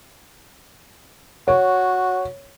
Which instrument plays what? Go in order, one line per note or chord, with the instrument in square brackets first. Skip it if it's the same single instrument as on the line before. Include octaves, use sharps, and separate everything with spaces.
[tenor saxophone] F#4 [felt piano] C#5